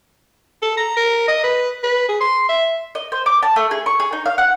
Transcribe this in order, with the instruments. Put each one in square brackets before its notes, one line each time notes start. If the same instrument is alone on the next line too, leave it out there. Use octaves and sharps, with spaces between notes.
[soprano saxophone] A4
A#5
A#4
D#5
B4
B4
G#4
C6
E5
[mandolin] D#5
C5
D6
A5
A3
G#4
C#6
G#4
D#4
F5
F#5